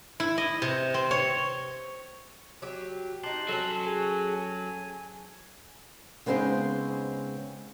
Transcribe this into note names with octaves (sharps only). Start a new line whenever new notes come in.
E4
D#5
C3
C4
C#5
F#3 G4
D#4 G4 A5 C6 F#6
F#3 C#4 A4
G#4 G#5
G#5
C#3 G#3 B3 C4 D#4 G#4